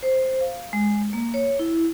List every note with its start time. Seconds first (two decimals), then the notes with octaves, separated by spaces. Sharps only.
0.03 C5
0.41 F5
0.73 G#3
1.13 A#3
1.34 C#5
1.59 E4